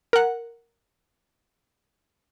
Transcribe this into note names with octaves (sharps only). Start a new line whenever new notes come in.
A#4 F#5